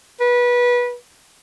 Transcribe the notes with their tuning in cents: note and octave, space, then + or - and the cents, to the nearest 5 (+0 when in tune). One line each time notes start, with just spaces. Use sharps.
B4 -20